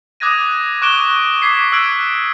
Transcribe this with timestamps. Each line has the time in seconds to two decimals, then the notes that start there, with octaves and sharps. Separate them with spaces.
0.20 D6 D#6 F#6 G#6 A#6 D#7
0.82 C#6 D6 F#6 D7 E7 G7
1.42 D6 G#6 B6 C7
1.72 E6 F#6 G#6 D7